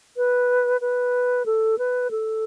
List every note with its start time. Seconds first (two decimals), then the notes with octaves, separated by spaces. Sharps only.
0.17 B4
0.81 B4
1.46 A4
1.78 B4
2.11 A4